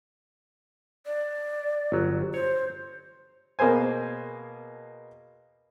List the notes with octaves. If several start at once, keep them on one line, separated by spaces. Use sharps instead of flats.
D5
G1 F#3
C5 C#5
B2 A#3 G#4 C5 G#5